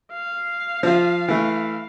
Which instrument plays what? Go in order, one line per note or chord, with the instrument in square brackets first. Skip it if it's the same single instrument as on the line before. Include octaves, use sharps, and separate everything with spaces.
[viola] F5
[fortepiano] F3 F4
E3 A3